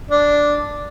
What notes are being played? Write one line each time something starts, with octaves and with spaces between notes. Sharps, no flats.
D4